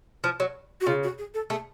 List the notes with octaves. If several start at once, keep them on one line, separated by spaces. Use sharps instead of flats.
F3
F#3
F#4
C#3 F4
F#4
G#4
A4
A3 G#4